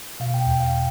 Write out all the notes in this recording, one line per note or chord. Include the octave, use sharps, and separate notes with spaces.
B2 F5
G5
E2 G5
F5